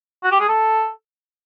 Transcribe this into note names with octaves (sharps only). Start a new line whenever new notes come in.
F#4
G4
G#4
A4